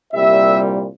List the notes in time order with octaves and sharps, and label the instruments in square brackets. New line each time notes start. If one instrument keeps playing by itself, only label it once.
[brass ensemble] C2 A#2 G3 E5